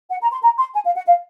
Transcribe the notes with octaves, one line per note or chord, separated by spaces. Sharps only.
F#5
A#5
C6
A#5
C6
G#5
F5
F#5
F5